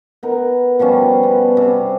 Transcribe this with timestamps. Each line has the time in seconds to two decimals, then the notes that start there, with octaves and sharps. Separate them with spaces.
0.23 B3 D#4 A#4
0.79 B2 F3 G3 C#4
1.23 B3
1.57 C3